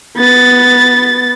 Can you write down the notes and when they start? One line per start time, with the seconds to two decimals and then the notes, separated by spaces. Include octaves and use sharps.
0.17 B3 A6